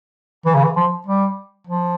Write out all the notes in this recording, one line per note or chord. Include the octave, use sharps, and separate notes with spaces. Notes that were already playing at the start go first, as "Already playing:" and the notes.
E3
C#3
E3
F3
G3
F3